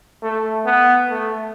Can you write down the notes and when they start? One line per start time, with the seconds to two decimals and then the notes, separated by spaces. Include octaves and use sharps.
0.23 A3
0.66 B3
1.10 A3